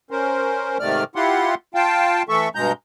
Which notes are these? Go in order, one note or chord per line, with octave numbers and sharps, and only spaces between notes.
C#4 A#4 C5
G#2 C3 D#3 A3 D5 F6
E4 F4 G4 F#5 C6
F4 F5 G5 A5
E3 A3 A4 E5 C#6
G2 B2 G#3 A#5 G6